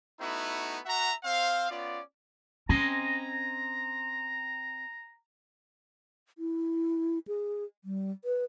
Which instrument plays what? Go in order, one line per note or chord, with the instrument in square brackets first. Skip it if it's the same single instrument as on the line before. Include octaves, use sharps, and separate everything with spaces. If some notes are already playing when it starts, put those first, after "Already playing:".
[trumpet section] A3 B3 D#4 E4 F#4
F#4 E5 F#5 A#5
C4 C5 F5
B3 C#4 F4 D5
[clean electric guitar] C4 D#5 G#5 [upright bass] C#4 [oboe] A#5
[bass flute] E4
G#4
G3
B4